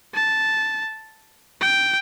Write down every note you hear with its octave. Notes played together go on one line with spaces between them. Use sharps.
A5
G5